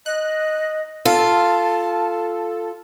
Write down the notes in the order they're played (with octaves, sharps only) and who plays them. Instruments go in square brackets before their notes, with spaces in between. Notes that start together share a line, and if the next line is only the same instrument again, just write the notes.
[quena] D#5 [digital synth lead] F#6
[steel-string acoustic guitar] F4 [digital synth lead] A4 [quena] A5